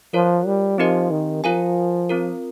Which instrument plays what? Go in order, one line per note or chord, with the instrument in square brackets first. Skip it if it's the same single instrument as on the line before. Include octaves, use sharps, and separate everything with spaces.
[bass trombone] F3 [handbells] F4 A#4 C#5
[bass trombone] G3
[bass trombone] F3 [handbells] C4 D#4 G4 A#4 D#5
[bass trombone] D#3
[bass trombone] F3 [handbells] F4 A#4 F5 G#5
[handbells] C4 F4 A#4